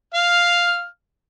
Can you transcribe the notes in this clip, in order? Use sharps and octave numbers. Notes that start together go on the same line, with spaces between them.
F5 F6